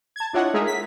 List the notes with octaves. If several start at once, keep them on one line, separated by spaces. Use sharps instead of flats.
A5 G#6
D4 E4 F4 C#5 D#5 F#5
G#3 D#4 G#4 A#4 E5
B6